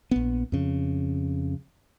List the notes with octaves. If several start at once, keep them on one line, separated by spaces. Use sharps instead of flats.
A#1 B3
F2 C#3